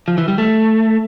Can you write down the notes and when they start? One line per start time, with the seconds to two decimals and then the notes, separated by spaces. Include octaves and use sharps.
0.08 F3
0.18 E3
0.28 G3
0.38 A3